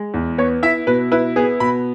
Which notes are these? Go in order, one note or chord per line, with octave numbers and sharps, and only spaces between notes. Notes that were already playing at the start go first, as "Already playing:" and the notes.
Already playing: G#3
E2
B3 C#5
E4 E5
B2 B4
E4 B4
B3 G#4
B2 B5